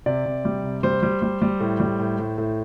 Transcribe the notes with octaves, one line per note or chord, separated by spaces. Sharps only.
C3 D5
C3
G3
C3
G3 C5
G3
G3
G3
A2
G3
A2
A2
A2